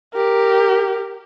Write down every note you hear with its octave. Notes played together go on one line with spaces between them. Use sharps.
G4 A#4